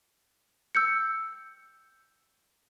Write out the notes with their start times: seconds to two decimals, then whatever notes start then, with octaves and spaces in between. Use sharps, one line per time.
0.75 E6 G6 C#7